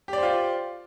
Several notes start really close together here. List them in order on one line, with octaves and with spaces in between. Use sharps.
G4 D5 C5 F4